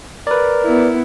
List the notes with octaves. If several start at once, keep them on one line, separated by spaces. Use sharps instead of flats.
A#4 B4 D5
B3 E4